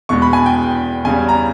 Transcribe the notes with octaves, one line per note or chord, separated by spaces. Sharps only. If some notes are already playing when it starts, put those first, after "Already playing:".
E2 B2 G#3 C#6
B5
G#5
G5
E2 C#3 G3 G#5
A#5